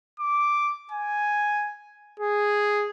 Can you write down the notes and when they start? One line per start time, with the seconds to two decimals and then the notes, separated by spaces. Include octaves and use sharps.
0.20 D6
0.91 G#5
2.20 G#4